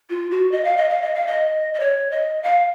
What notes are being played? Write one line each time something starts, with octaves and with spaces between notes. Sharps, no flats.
F4
F#4
D#5
F5
D#5
F5
D#5
F5
D#5
D#5
C#5
D#5
F5